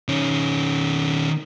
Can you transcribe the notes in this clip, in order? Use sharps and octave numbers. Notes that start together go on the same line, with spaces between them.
D#3 C#4